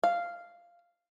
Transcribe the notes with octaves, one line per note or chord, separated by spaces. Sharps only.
F5